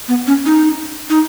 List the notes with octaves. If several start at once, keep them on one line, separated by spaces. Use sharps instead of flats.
B3
C#4
D#4
D#4